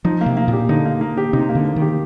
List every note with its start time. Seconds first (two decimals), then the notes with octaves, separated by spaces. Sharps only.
0.05 F3 D#4
0.21 A#3
0.26 C3
0.37 A#3
0.48 A#2
0.53 G4
0.69 D3 D#4
0.85 A#3
1.01 A#3
1.17 G4
1.33 C3 D#4
1.49 A#3
1.55 D3
1.66 A#3
1.76 D#3
1.82 G4